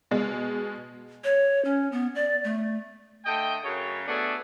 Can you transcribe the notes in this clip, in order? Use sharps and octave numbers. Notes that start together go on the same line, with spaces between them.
B2 G#3
C#5
C#4
B3
D5
A3
D3 A3 D#5 G5
F#2 C#3 C#5
A3 B3 D4 F#4 G#4 A4